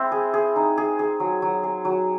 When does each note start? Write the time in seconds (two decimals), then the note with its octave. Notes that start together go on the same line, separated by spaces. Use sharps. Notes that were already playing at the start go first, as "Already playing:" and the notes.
Already playing: G#3 C4 E4
0.12 G#4
0.34 G#4
0.56 D#4
0.78 G#4
0.99 G#4
1.20 F#3
1.42 F#3
1.63 G#4
1.85 F#3